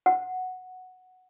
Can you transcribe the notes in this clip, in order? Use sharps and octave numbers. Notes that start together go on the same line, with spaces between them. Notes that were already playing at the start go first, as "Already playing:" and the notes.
F#5